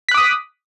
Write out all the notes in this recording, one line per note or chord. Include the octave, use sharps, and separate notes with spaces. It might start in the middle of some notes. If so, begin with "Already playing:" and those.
D6 D#6 F#6 B6